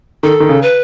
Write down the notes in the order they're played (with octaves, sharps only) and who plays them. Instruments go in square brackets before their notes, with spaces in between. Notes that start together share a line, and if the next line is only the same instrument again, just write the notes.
[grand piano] D#3 [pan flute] A4
[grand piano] D#3
C#3
[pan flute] B4